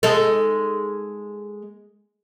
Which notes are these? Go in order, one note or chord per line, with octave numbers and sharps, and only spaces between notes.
G#3 D#4 A4